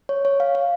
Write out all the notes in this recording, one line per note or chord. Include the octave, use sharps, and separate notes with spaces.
C#5
C#5
F5
F5